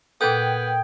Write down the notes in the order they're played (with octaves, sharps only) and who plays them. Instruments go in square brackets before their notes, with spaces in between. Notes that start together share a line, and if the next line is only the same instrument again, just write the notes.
[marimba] A#2 A4 [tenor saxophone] B3 [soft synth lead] G5 [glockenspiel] D#6 G6 G#6